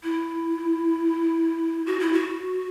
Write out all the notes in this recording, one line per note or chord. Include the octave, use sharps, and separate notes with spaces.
E4
F#4
E4
F#4